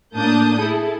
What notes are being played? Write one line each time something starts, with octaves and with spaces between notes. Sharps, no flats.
A2 A#3 D4 A5 D#6 G6
E4 G#4 A4